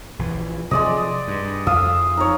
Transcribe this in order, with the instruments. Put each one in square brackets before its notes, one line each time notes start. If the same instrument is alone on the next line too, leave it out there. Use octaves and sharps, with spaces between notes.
[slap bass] A#1 E3
[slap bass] C3 F3 F#3 [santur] G#3 D5 D#5
[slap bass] G2
[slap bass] F2 [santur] E5 F5 D#6
[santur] D#4 C#5